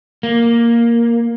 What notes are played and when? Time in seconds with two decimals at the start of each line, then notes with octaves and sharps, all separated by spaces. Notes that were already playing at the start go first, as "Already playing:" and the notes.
0.23 A#3